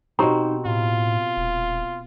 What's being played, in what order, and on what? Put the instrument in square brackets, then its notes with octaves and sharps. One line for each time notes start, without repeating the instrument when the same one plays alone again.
[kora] B2 C4 [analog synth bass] D#4 [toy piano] G4 A#5
[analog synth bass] A2 [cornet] F4
[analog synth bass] D#1